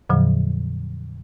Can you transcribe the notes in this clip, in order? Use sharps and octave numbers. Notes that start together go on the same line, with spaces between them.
F2 A#2 D3 F3 F#3